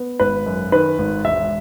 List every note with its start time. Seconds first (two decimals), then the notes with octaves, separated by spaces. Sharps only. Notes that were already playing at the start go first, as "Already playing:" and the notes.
Already playing: B3
0.20 G#1 B4
0.46 F#2
0.72 D#3 B4
0.98 G#1
1.25 E1 E5